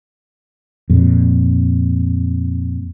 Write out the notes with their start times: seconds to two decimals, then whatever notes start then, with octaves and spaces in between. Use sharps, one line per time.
0.90 F2 A#2